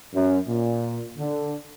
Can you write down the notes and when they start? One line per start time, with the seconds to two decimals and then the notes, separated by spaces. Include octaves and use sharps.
0.14 F#2
0.48 A#2
1.18 D3